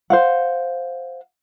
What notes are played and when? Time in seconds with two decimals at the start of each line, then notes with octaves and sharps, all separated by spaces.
0.10 C5 F5 F#5